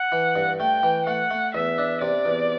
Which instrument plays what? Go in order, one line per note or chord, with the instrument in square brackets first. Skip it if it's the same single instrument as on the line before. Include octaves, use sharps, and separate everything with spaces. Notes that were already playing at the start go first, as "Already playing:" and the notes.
Already playing: [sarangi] F#5
[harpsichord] E3
G2
[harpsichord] A3 [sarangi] G5
[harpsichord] E3
[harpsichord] A3 [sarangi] F#5
[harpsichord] A3
[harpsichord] E2 [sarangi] E5
[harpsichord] D4
[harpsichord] C3 [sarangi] D5
[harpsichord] E2